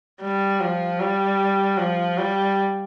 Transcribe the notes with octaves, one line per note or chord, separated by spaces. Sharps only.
G3
F3
G3
F3
G3